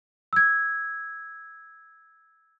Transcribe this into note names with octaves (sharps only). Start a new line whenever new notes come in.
E6 G#6